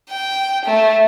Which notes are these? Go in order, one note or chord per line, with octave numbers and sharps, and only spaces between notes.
G5
A3